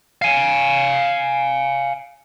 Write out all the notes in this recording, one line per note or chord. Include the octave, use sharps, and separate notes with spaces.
F5 G#5